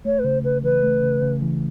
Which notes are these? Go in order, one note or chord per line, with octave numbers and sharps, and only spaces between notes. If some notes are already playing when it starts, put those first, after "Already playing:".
A3 C#5
B4
C#3 C5
C#3 B4
E3 B4
A3
C#3
C#3
E3